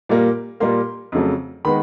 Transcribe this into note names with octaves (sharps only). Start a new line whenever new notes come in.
A#2 G3 A#3
A#2 G3 A#3 C6
F2 C#3 F#3 A3
D#3 G#3 B3 B5